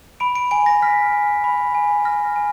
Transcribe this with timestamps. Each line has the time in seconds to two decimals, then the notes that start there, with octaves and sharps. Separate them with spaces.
0.20 B5 D7
0.35 D7
0.51 G#5 D7
0.66 A#6
0.82 F6 B6
1.13 G#5
1.44 B5
1.75 G#5
2.05 F6 A#6
2.36 G#5